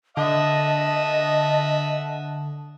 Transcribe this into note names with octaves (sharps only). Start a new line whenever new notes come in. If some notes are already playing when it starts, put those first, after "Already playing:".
D3 D#5 E5 F#5 A5 D#6